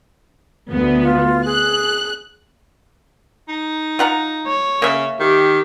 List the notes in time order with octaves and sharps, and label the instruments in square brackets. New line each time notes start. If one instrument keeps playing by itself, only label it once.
[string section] D2 B3
[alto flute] F4
[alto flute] G#4 [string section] F#6
[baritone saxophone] D#4
[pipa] F4 F#5 A#5
[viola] C#5
[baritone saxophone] C#3 [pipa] A#3 E5
[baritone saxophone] D#3 [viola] G4